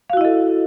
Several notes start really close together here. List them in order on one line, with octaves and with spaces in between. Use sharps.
F5 F#4 E4 D#5 A4